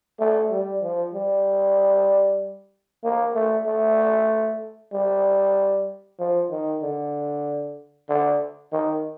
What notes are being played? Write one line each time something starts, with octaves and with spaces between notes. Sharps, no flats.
A3
G3
F3
G3
A#3
A3
A3
G3
F3
D#3
D3
D3
D#3